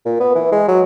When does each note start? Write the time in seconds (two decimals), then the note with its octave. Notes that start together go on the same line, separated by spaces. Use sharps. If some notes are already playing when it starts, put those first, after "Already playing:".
0.05 A#2
0.20 B3
0.35 E3
0.52 G#3
0.68 F#3